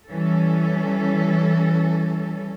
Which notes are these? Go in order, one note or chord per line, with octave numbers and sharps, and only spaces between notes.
E3 G3 C#4 A4